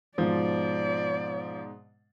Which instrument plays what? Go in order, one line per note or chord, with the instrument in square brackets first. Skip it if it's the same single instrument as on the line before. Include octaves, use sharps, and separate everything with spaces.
[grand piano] G#2 B2 [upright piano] F3 [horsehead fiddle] D5